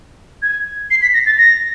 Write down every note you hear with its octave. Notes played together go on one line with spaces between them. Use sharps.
G#6
C7
B6
A#6
A6
A#6